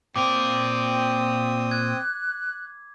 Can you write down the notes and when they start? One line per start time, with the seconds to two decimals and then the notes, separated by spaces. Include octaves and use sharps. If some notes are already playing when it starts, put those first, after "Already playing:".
0.16 A#2 C4 A#4 G5 D6 D#6
1.71 F#6 G#6